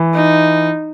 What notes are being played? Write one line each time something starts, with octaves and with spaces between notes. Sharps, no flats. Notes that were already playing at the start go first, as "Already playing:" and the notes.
Already playing: E3
D#4